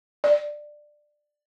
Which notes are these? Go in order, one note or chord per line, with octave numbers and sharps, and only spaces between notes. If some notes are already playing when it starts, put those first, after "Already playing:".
D5